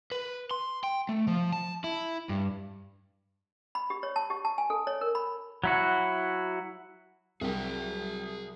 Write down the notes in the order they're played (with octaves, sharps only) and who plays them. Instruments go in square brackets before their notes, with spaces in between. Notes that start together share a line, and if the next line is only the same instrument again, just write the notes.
[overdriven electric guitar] B4
C6
G5
A3
F3
A5
E4
G2
[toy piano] B5
G4
C#5
A5
G4
A5
G#5
A4
C#5
A#4
B5
[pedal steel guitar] F#3 E4 F#4
[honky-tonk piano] C2 [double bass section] F#3 [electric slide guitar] G#4 G5